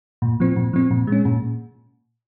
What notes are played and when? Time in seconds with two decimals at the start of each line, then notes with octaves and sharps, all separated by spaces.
0.22 A#2
0.40 F3 C4
0.56 A#2
0.73 F3 C4
0.91 A#2
1.07 G#3
1.12 C#4
1.25 A#2